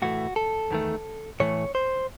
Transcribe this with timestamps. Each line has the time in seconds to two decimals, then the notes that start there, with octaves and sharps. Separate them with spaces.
0.02 A2 E3 A3 F#4
0.36 A4
0.71 E2 D#3 A3
1.40 A2 E3 A3 C#5
1.75 C5